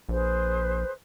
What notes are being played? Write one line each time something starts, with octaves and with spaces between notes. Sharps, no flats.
A#1 G#4 B4 C5